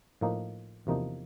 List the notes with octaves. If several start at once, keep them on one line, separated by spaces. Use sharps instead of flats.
A2 F3 A#3 D#4
E2 C3 F3 A#3 D#4